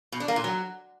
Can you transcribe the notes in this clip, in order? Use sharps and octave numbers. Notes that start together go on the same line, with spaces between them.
B2
D4
A#3
A#2
F#3